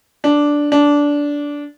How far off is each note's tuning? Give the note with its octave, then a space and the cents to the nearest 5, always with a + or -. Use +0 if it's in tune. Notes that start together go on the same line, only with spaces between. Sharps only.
D4 -5
D4 -15